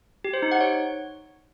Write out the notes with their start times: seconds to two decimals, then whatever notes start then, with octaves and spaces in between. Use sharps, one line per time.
0.24 G4
0.33 C5
0.42 D#4
0.51 F#5
0.61 C#5